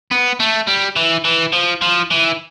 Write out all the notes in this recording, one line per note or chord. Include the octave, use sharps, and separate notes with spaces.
B3
A3
G3
E3
E3
F3
F3
E3